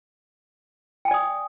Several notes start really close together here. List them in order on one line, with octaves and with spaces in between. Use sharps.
G5 G#5 D5 D#6